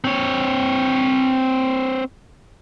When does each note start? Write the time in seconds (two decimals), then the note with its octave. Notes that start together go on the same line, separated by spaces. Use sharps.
0.04 C4 C#5